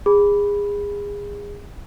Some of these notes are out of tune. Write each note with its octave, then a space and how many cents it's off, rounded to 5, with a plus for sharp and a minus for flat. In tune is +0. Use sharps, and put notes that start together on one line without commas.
G#4 -25 B5 +0